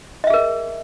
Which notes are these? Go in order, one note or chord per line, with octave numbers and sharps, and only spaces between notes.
G#4 A#4 D#5 E5